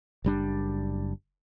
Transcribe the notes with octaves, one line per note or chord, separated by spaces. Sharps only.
F#1 G3 D4